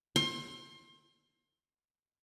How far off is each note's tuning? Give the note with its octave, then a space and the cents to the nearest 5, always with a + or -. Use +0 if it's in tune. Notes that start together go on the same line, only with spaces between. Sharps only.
C6 +30